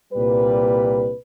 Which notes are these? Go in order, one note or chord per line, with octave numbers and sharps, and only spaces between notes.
C2 A#2 G3 B4